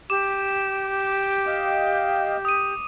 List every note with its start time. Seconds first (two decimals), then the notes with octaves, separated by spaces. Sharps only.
0.10 G4 D6 E7
1.47 D#5 F5 G5
2.45 D#6 D#7